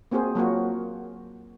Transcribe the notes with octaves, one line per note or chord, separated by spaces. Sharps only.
A#3 C4 F#4 G#4 C5
F#3 A#3 F4 F#4